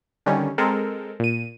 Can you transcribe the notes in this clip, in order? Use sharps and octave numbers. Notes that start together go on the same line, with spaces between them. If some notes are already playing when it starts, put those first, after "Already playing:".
D3 D#3 G3 C#4
G#3 C4 A4 A#4
A#2 D#7